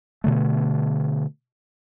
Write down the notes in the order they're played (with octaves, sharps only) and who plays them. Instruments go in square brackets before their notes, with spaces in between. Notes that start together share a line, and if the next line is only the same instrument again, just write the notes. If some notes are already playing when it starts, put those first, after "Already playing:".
[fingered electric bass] B2 D3 A3